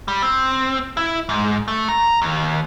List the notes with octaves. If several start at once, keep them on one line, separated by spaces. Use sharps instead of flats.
G3
C4
E4
G#2
A3
A#5
D#2